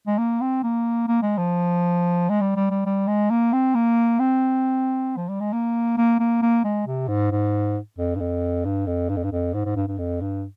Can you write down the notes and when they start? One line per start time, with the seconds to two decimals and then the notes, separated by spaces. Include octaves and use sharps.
0.07 G#3
0.18 A#3
0.41 C4
0.63 A#3
1.08 A#3
1.22 G#3
1.37 F3
2.29 G#3
2.41 G3
2.56 G3
2.71 G3
2.86 G3
3.08 G#3
3.31 A#3
3.53 C4
3.75 A#3
4.19 C4
5.16 F3
5.29 G3
5.41 G#3
5.53 A#3
5.98 A#3
6.20 A#3
6.42 A#3
6.64 G#3
6.86 C3
7.08 G#2
7.31 G#2
7.98 F2
8.15 G2
8.20 F2
8.65 G2
8.87 F2
9.09 G2
9.16 F2
9.24 G2
9.32 F2
9.54 G#2
9.65 G#2
9.76 G2
9.87 G2
9.98 F2
10.21 G2